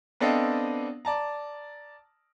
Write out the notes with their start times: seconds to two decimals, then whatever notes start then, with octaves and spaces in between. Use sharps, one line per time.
0.20 B3 C4 D4 A4 D#5 F5
1.05 D5 A5 A#5